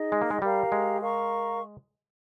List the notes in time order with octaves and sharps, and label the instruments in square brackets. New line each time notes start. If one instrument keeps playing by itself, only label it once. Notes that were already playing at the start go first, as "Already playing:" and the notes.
Already playing: [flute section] D#4 G#4 D#5
[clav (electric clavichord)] G#3
A#3
G#3
[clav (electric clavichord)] G3 [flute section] G4 A#4 F5 A#5
[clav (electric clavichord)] G#3
[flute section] A#4 F5 A#5 C#6